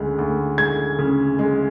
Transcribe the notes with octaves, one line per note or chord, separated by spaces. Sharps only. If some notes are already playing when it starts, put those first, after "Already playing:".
Already playing: D2 C#3 G#3
D2
G#3 G#6
C#3
G#3